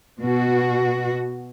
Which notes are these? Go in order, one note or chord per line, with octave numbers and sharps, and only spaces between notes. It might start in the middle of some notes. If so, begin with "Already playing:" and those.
B2 F#4